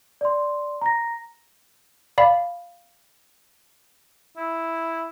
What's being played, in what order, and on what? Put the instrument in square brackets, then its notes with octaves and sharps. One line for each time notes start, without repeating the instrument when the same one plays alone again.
[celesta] D5 C6
A#5 A#6
[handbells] D5 F5 B5
[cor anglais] E4